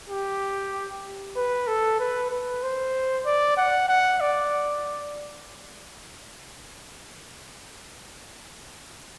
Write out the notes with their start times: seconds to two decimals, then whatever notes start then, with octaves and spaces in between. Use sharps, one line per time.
0.10 G4
1.36 B4
1.67 A4
2.00 B4
2.31 B4
2.63 C5
3.25 D5
3.57 F#5
3.89 F#5
4.21 D5